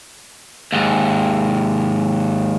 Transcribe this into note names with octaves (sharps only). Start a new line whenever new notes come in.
D#2 G#2